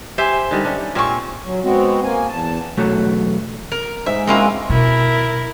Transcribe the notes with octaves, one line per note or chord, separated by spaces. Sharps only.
G4 C5 E5 G#5
D3 D#3 G3
C#4 D4
A#2 C4 F5 G#5 C#6
F#3
G#3 B3 C4 F#4
A#3 G#5
E2 A5
B1 E2 F#3 A3
A#4
G#2 E5
G#3 A#3 C4 C#4 E4 F4
B2 E4 A#4